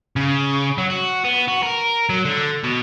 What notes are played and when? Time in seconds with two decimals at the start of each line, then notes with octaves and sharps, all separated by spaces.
0.16 C#3
0.78 F#3
0.90 F#4
1.25 B3
1.48 F#4
1.63 A#4
2.09 F#3
2.25 D3
2.64 B2